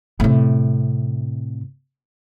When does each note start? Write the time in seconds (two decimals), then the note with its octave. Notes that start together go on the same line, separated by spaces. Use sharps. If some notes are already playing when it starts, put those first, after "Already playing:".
0.20 A2 C3